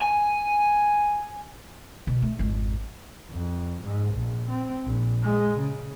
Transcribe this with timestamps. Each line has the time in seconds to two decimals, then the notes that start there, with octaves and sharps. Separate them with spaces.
0.01 G#5
2.07 B2
2.22 A3
2.39 G#1 F2
3.31 F2
3.83 G#2
4.14 A#1
4.49 C4
4.85 A#1
5.23 G#3
5.60 C#3